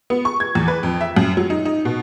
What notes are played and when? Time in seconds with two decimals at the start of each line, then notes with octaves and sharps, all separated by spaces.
0.10 B3
0.25 C#6
0.40 G#6
0.55 E2
0.68 B4
0.83 F2
1.01 E5
1.16 F#2
1.37 F#3
1.50 D#4
1.65 D#4
1.85 B2